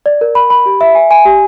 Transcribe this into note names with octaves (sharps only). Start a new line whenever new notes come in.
D5
A#4
B5
B5
G4
E5
G#5
G#5
G4